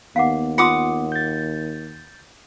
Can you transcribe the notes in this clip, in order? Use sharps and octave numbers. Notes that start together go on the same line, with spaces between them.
D#2 B3 F5 F#5 D6
F4 F#5 C6 D6 D#6
G6 A6